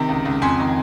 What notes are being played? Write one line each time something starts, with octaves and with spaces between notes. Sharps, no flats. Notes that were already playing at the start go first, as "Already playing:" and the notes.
Already playing: C3 D#3 A#5
C#2
C#2
F2 G#5 C6
D#3